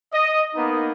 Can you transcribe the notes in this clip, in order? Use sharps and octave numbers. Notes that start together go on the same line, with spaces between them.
D#5
A#3 B3 D#4